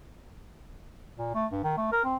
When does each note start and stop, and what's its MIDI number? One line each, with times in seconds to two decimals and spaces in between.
1.18 1.30 46
1.35 1.46 57
1.51 1.62 43
1.63 1.73 51
1.77 1.91 57
1.92 2.01 70
2.04 2.16 60